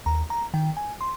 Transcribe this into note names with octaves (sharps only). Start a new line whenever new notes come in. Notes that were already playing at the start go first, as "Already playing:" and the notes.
D#2 A#5
A#5
D#3 G5
G#5
C6